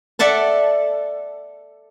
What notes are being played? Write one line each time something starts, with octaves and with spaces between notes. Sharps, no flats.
A4 D5 E5 F#5 A5